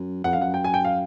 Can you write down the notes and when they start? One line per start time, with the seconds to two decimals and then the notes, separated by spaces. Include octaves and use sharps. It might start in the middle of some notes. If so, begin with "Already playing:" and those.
Already playing: F#2
0.24 F2 F#5
0.33 F5
0.39 F#2 F#5
0.54 G5
0.64 G#5
0.74 G5
0.84 F5